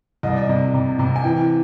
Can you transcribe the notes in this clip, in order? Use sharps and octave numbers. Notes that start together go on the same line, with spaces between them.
C2 D#5
D5
D#5
C3
C3
C3
G#5
E3 G5